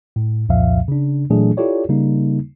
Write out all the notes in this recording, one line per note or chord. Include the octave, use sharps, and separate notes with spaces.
A2
C2 F2 A#2 F3 E5 F5
C#3 D4
A#2 E3 F#3 A3 D4 G#4
E4 F4 G4 A4 C#5 D5
C#3 G3 A#3 D#4